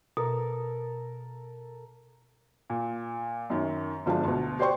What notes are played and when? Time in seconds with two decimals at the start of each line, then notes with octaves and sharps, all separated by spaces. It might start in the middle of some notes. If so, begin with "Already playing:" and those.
0.17 B2 A4 A#4
2.70 A#2
3.50 F#2 D#3
4.06 G1 F3 G#3 D4 A5
4.25 D2 B2
4.59 G4 C5 D5 G5 C6 C#6